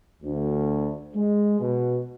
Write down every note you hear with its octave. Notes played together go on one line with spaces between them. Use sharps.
D2
G#3
B2